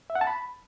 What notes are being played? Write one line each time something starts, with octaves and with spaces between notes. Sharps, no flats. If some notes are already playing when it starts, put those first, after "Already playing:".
E5
F#5
A5
B5